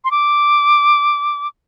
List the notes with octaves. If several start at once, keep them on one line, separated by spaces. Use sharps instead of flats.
C6
D6